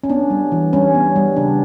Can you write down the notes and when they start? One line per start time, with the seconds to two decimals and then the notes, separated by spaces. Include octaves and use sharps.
0.03 C#4
0.09 B3 D4
0.30 G3
0.52 E3
0.73 G3 C#4
0.95 B3
1.16 G3
1.36 C#3 D4